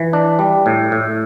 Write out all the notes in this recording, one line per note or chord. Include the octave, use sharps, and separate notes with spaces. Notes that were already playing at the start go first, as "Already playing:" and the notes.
Already playing: E3
D4
G3
A2
A2